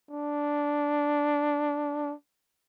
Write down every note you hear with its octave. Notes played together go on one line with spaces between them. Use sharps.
D4